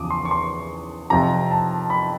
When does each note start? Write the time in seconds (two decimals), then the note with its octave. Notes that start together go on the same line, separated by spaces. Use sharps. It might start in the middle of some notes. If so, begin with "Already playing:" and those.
Already playing: E2 C#3 F3 D6 D#6
0.10 C6
0.25 C#6
0.31 C6
1.10 F2 C3 F3 A#5
1.51 A5
1.90 B5